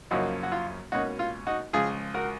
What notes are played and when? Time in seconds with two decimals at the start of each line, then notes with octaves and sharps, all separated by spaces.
0.11 F#2 C#3 F3 A#3 C#4 D#4 F#4
0.43 F#4
0.52 F4
0.92 C#2 B2 A#3 C#4 D#4 F#4
1.19 F4
1.47 D#4 F#4
1.73 C#2 C#3 F3 F4 G#4
2.14 F#4 A#4